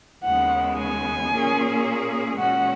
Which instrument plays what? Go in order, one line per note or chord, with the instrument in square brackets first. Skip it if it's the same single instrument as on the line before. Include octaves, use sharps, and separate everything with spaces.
[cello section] D#2 C#3 G#3 B3 [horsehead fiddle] F#5
[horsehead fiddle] G#5
[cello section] A#2 A#3 C#4 G#4
[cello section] A#2 G#3 C#4 F#4 [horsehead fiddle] F#5